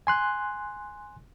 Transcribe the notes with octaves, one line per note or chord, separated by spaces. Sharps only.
G#5 C6 F#6